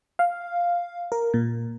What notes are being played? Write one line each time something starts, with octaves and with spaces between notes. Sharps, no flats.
F5
A#4
A#2